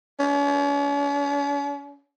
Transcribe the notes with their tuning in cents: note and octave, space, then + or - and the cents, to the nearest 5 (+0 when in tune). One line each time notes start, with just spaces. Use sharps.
C#4 +45